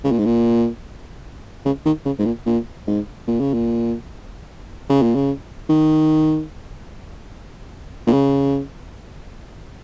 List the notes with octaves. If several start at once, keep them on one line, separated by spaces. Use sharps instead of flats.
C#3
A#2
G#2
A#2
C#3
D#3
C#3
G#2
A#2
A#2
G#2
A#2
C#3
A#2
C#3
A#2
C#3
D#3
A#2
C#3